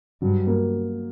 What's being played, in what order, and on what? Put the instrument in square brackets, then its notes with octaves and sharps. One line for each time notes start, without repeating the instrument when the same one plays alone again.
[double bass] G2 [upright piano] F#3
[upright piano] A#3